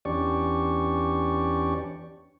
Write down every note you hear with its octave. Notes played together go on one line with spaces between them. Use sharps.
E2 C#4 D4 G4 D5 C#6